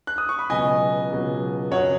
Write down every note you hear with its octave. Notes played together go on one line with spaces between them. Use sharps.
F#6
D#6
C#6
B5
C#2 B2 F#3 D#5 G#5
C#2 B2 F#3
F#2 C#3 F#3 C#5 F#5